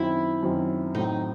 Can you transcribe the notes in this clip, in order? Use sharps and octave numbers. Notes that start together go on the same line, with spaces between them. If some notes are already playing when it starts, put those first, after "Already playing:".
Already playing: F#2 D#3 F#3 C4 E4
F#2 D#3 F#3 C4
A2 F#3 C4 D#4